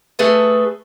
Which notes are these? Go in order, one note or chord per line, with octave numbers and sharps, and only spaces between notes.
A3 G#4 A4 B4